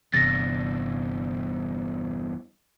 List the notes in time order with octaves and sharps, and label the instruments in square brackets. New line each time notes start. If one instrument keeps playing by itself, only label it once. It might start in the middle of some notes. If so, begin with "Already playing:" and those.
[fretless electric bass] G1 C3 E3 [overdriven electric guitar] E2 G2 [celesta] A6 A#6